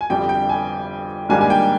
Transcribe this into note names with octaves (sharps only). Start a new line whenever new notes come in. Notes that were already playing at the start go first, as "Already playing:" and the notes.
G#5
G1 F2 D3 G3 G5
G5
G#5
G#2 D#3 G3 A#3 D4 G#5
G#5
G5